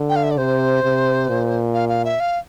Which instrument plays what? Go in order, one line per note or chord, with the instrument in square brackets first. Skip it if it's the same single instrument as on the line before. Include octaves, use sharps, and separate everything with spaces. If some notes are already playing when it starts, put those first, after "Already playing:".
Already playing: [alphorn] D3
[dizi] G5
F5
E5
D5
[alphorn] C3 [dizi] C5
[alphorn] C3
A#2
[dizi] F5
F5
E5
F5